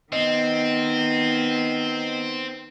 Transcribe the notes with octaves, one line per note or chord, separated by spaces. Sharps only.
D#3 B3 C4 D#5